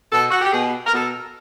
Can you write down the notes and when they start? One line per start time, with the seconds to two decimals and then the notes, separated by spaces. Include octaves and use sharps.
0.13 B2 A4
0.30 F#4
0.42 G4
0.52 B2 G#4
0.86 A#4
0.93 B2 A4